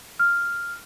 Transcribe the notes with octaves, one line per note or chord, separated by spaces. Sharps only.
F6